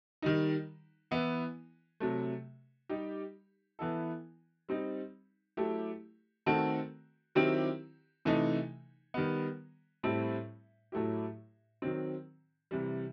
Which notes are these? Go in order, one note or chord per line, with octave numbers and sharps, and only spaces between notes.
D#3 G3 D#4
E3 B3 E4
C3 F#3 A3
G3 D#4 G4
E3 B3 E4 A4
G3 C4 D#4
F#3 A3 E4 G4
D#3 A3 C4 F#4 A4
D#3 F#3 C4 E4 G4
C3 E3 A3 D#4
D#3 G3 B3
A2 G3 C4 E4 A4
A2 F#3 A3 E4 G4
D#3 F#3 C4
C3 E3 G3